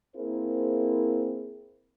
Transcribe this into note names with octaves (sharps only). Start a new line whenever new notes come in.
A#3 C4 E4 G#4 A#4 C5